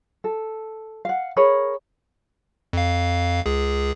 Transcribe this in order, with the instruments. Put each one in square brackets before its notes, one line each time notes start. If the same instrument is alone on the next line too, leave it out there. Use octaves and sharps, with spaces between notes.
[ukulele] A4
F5 F#5
G#4 A#4 C#5 B5
[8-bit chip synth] F2 F5
C#2 G#4